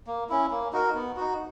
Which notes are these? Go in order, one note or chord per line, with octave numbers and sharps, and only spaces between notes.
A#3
C#4 E4
A#3
D#4 F#4 A#4
B3
D#4 F#4